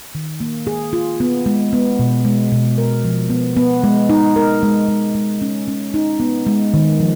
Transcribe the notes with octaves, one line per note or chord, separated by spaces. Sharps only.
D#3
A#3
G#4
F4
B3
G#3
B3
B2
G#3
B2
A#4
F3
B3
B3
G#3
D#4
A#4
G#3
G#3
G#3
C#4
C#4
D#4
B3
G#3
D#3
F3